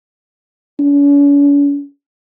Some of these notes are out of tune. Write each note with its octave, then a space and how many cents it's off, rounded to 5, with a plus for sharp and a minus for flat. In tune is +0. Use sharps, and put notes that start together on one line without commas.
C#4 +45